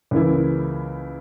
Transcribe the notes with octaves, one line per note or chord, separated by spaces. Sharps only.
C#2 C#3 E3 A#3 E4